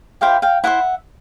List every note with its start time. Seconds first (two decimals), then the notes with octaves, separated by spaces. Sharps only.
0.21 E4 G4 C5 F5 G5
0.42 F5 G5
0.64 E4 G4 C5 E5 F#5